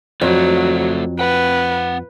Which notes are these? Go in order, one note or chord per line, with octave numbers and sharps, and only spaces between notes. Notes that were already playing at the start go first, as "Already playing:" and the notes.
F2 F#3 A3 C5 D5
C4 B4 F#5 G5